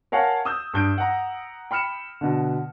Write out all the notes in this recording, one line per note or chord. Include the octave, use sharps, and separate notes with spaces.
A#4 C#5 F5 F#5 G#5 A5
D#6 E6 G6
G2 G6 D7
F#5 A#5
G5 B5 F6 C#7 E7
B2 D3